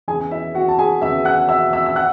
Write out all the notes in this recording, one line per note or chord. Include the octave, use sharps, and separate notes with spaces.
E2 C#3 E3 G#4 G#5
E4 E5
F#4 F#5
A5
G#4 G#5
E2 C#3 E3 E5 E6
F#5 F#6
E5 E6
E5 E6
E6
F#5 F#6